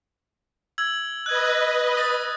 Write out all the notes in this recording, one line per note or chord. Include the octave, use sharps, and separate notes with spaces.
E6 G#6 F#7
B4 D#5 F#6 G#6
D#6 A6